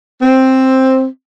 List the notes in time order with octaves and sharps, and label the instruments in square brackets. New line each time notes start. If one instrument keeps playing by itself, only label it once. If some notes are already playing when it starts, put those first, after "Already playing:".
[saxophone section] C4